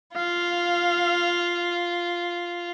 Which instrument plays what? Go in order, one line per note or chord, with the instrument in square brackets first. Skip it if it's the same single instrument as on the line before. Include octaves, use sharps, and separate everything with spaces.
[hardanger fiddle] F4 [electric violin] F5